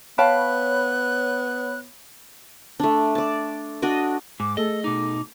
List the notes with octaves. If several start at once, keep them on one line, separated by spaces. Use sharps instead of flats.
B3 C#5 F5 G5 A5 B5 F#6
A3 D4
D5 A5
D4 F#4 D5 D#5
G#2 D6
A3 G#4 A4 D#5
B2 D#4 D6